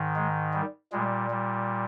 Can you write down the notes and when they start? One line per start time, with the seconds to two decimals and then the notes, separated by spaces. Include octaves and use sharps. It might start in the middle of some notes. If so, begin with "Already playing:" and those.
Already playing: G#2 D#3
0.16 G#3
0.54 G3
0.92 A#2 G3 G#3
1.30 G3